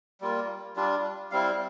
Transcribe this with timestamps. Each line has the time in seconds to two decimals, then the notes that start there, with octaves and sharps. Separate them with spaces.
0.21 G3 A#3 F4
0.76 G3 D4 F4
1.31 G3 C4 E4 F5